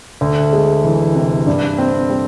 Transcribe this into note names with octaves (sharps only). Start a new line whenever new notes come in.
D2
G#3
E3
C3
G2
C4
G3